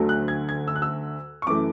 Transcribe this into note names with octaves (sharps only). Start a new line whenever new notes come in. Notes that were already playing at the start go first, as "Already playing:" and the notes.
Already playing: D2 D3 F#3 A3
F#6
G#6
G#6
E6
F#6
E6
C#6
F#2 E3 A3 D6